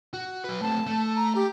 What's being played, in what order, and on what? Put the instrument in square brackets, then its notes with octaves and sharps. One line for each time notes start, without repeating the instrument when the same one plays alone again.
[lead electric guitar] F#4
F#3 B4
[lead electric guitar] A3 C4 [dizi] A5
[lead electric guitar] A3
[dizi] A#5
G4